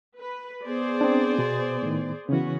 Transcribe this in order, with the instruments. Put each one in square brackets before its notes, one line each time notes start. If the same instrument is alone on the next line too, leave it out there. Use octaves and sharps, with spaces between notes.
[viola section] B4
[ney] B3 [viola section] G#4 C5 D5
[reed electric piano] C4 D4
B2
A2 D#3
[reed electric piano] C#3 E3 [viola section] B3 C#4 F#4